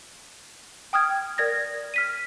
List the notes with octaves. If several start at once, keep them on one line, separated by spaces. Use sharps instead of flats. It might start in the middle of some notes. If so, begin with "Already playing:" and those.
G5 D#6 F6 G#6
A#4 D5 G#6 A#6
F6 B6 D#7